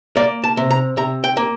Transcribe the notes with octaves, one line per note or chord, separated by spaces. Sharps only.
A#3 D5
A5
C3
A#5
C3 A#5
G5
A#3